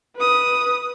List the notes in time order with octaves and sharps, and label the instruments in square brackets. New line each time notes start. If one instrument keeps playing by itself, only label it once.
[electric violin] B4 D#6